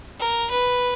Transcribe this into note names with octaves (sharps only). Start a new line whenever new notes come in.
A#4
B4